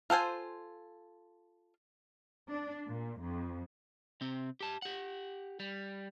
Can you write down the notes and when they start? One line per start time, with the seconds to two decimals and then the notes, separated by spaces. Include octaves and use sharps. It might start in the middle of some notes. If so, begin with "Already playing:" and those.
0.10 F4 A4 C5 G#5
2.50 D4
2.90 A#2
3.21 F2
4.21 C3 C4
4.61 G4 A5
4.82 G4 F#5
5.60 G3